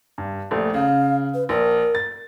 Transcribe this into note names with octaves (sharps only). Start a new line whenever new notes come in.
G2
A#1 A3
C#3 F5
B4
A#1 A#4
A6